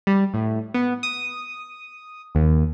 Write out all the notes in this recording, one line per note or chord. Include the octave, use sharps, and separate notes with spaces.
G3
A2
B3
D#6
D#2